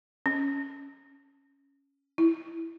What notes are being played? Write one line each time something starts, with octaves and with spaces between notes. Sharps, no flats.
C#4
E4